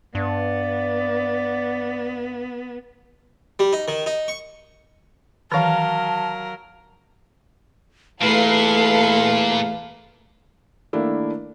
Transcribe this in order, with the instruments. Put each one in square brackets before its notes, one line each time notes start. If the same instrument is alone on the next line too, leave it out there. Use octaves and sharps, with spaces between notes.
[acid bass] G2 [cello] B3 [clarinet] D5
[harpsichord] G3
D#4
D#3
D#4
C#6
[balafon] D#3 E3 [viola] F#3 A#4 [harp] F5 F6 [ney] A5
[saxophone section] E2 F5 [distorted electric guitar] A#2 [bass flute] A3 [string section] A4 B4 C7
[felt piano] D#3 A3 A#3 D4 E4